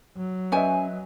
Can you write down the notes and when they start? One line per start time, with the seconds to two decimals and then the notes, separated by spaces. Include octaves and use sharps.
0.17 F#3
0.52 C#4 B4 C5 D#5 E5 G#5